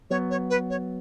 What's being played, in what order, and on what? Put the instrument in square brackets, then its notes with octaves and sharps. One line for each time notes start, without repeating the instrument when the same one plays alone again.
[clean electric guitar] F#3 B3 [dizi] C#5
[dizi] C#5
B4
C#5